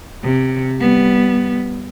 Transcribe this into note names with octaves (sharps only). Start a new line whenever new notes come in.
C3
G3 B3